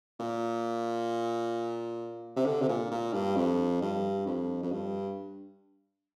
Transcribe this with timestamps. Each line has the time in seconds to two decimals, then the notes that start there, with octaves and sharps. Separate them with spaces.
0.20 A#2
2.36 C3
2.46 D3
2.62 C3
2.69 A#2
2.91 A#2
3.13 G2
3.36 F2
3.82 G2
4.26 F2
4.63 F2
4.72 G2